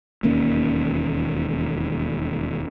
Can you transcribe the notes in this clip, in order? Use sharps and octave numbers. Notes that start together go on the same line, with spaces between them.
E1 D#2 A#3 C#4